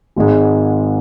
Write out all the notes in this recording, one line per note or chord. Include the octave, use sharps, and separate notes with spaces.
G#1 G#2 G#3